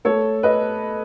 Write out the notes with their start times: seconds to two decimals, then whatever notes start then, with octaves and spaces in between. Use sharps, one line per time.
0.05 A3 A4 C#5
0.43 B4 D#5